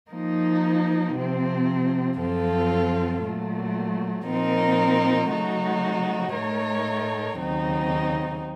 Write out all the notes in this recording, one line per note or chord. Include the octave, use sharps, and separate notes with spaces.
F3 A#3 D#4
C3 F3 C4
F#2 F3 C4 F4 A4
A#2 F#3 A3
A#2 F3 C4 D#4 A#4
C#3 F#3 A3 D#4 F#4
A2 A3 D#4 A#4 C#5
D#2 C#3 F#3 C4 D#4